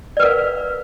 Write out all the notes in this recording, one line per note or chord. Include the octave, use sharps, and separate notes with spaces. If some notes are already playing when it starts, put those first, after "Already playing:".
A#4 B4 D5 F5